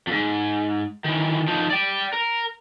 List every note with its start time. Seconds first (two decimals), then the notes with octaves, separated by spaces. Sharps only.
0.07 F2 G#2
1.04 D#3 E3
1.48 F3 D#4
1.70 D5 G5
2.13 A#4